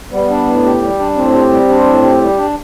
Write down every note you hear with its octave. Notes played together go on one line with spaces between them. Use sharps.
G3 B3
D4
A2
G4
G3
D4
A2 C4
G4
G3
D4
A2
G4
G3
D4